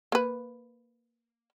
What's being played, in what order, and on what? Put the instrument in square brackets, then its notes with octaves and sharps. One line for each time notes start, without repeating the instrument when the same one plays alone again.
[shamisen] A#3 B4